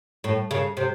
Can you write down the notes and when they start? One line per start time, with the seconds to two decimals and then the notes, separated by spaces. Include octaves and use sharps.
0.24 A2
0.51 C#3
0.77 C3